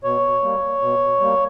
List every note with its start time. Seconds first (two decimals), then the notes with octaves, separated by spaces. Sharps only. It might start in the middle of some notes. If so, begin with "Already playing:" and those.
0.04 B2 C#5
0.43 G3 A#3
0.82 B2
1.20 G3 A#3